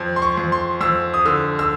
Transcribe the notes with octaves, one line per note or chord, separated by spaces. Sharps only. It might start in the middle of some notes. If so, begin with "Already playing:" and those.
Already playing: F2
C6
C#6
F2
C6
F2 E6
D#6
D3 E6
E6